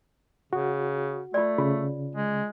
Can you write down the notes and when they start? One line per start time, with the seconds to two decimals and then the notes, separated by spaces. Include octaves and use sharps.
0.53 C#3 F#4
1.34 A3 F4 D5
1.58 C#3 F4
2.16 G#3